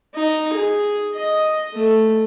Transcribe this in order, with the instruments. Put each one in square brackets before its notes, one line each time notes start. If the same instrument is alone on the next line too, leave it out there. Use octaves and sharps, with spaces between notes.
[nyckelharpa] D#4
G#4
D#5
A3